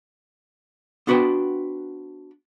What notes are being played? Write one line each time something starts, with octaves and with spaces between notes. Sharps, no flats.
B3 D4 F#4 B4 C5 G5